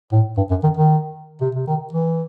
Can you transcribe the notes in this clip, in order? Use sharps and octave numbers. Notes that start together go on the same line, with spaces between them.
A2
G2
F#2
D#3
D#3
C3
C3
D#3
E3